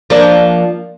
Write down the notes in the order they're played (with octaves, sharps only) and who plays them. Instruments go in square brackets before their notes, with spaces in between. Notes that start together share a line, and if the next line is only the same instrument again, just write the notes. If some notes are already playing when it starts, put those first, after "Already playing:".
[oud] F3 A#3 D4